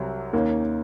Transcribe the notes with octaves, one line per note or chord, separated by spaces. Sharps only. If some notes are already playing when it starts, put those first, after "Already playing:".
Already playing: C2 C3 F#3
D#2 D#3 A#3 C#4